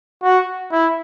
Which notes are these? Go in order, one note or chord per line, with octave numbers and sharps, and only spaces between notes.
F#4
E4